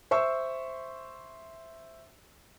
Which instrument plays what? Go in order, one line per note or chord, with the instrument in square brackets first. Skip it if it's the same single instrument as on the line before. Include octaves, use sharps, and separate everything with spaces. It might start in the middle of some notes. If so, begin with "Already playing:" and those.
[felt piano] C5 E5 C#6 E6